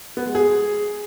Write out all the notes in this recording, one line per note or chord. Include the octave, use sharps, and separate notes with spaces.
B3
G#3
G#4